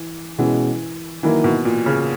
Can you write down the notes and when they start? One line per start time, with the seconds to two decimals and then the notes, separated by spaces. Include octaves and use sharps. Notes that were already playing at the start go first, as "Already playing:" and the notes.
Already playing: E3
0.38 B2 E3 G#3 C#4
1.23 D#3 E3 F#3 A#3 E4 A#4
1.44 B2
1.65 A#2
1.86 C#3